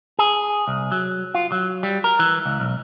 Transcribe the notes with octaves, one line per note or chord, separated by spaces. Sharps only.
G#4
C2
F#3
F4
F#3
G3
A#4
E3
C#2
B1